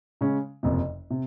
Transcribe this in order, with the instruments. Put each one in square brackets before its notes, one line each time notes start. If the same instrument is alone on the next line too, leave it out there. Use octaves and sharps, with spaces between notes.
[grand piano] C#3 G#3 C#4
F#1 F2 C3
C3